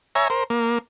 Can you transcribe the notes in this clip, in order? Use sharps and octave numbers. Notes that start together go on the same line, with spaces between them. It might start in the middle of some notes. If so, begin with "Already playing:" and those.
C#5 E5 G#5 A#5
A#4 C5
A#3